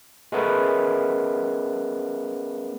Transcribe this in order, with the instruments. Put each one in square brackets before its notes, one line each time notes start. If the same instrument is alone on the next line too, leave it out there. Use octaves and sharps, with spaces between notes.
[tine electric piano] G#3 A3 B3 C#4 A#4 B4